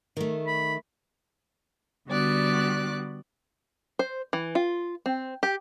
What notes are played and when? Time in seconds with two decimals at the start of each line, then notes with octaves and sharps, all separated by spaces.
0.17 D#3 A3
0.47 B5
2.08 D3 G3 B3 F#4 D5 F#6
3.99 C5
4.33 E3
4.55 F4
5.06 C4
5.43 G4